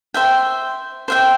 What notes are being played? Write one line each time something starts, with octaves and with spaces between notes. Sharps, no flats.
C5 E5 G5
C5 E5 G5